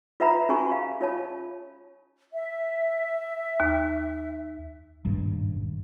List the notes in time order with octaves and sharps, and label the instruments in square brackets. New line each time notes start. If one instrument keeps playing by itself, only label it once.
[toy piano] F4 B4 E5 F#5 A#5 B5
C#4 F#4 G4 G#5 A5 C#6
F5
F4 C#5 A5
[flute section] E5
[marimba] D#2
[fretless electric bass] D#1 G#1 G2